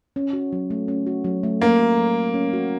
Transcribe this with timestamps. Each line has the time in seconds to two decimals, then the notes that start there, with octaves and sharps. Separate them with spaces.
0.16 C#4
0.33 F#4
0.52 F#3
0.70 A3
0.88 C#4
1.07 F#4
1.24 F#3
1.43 A3
1.61 A#3 C#4
1.79 F#4
1.97 F#3
2.16 A3
2.34 C#4
2.53 F#4